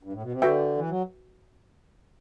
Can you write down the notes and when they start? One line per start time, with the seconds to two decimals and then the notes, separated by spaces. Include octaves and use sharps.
0.03 G2
0.13 A2
0.23 B2
0.32 C3
0.42 D3 F#4 B4 E5 G5
0.77 E3
0.90 F#3